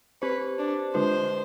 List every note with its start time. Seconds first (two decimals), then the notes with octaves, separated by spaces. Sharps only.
0.22 C4 G4 B4 C5
0.58 D4
0.94 D3 G#3 D4 F4 B4 C5